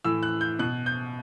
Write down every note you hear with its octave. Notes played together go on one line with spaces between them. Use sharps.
A2 E3 E6
F#6
G6
B2 F#6
G6